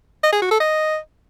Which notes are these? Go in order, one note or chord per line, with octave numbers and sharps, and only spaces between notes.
D#5
G#4
F#4
A4
D#5